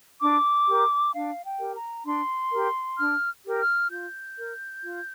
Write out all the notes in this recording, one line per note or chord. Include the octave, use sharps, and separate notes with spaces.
D4 D6
G4 A#4
D4 F5
G5
G4 A#4
A#5
D4 C6
G4 A#4
D4 F6
G4 A#4
F6
F4 G6
A#4
F4